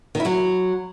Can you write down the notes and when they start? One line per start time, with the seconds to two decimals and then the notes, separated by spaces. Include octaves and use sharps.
0.15 D#3
0.20 E4
0.25 F#3